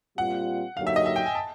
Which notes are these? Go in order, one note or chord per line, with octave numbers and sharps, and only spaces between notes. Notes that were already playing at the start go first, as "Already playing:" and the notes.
A#2 G3 C4 F4 F#5
D3 F#3 A#3 D#4 G4 F5
E5
D#5
E5
G5
G#5
A5